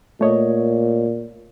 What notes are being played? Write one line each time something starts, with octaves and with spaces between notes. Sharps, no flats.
A#2 A3 C#5 D#5